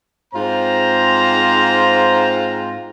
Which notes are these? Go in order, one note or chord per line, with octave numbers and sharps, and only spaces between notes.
G#2 C4 F4 C5 A#5